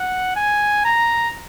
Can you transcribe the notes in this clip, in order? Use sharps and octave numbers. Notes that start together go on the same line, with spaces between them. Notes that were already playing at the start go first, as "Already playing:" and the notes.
Already playing: F#5
G#5
A#5